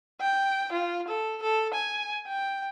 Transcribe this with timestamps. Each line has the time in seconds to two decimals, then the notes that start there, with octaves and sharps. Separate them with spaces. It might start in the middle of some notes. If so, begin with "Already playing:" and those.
0.21 G5
0.73 F4
1.08 A4
1.43 A4
1.74 G#5
2.27 G5